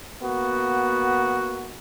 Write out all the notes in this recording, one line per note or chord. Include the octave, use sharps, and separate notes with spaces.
A#3 B3 F#4